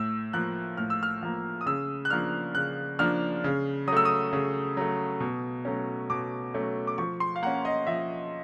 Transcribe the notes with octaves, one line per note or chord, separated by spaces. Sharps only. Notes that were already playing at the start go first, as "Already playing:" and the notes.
Already playing: A2 E6
F3 A#3 F#6
A2 F6
E6
F6
F3 A#3
D#6
C#3 E6
F#6
F3 A#3 D4 F6
C#3 F#6
F3 A#3 D4 F6
C#3
F#3 A3 D#6 E6
D#6
C#3
F#3 A3
B2
F#3 A3 C#4
B2 D6
F#3 A3 C#4
D6
F3 C#6
C6
F5
A#3 C#4 F#5
D#5
F3 E5